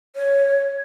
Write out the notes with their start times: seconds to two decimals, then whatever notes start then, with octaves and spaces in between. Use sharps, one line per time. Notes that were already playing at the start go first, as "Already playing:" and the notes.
0.16 C#5